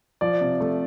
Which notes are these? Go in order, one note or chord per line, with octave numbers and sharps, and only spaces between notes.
F3 D5
C3
A3